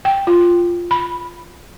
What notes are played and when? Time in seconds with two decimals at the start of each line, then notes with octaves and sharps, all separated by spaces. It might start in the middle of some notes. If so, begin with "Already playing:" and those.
0.05 G5
0.27 F4
0.91 B5